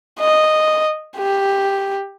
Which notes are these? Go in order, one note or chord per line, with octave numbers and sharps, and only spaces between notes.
D#5
G4